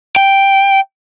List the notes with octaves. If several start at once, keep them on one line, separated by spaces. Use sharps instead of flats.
G5